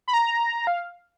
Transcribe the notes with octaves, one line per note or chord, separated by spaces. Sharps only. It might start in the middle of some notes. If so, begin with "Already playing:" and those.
B5
A#5
F5